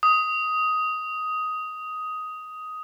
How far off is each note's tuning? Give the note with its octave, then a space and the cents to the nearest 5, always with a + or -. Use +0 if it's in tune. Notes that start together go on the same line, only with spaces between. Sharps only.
D#6 +10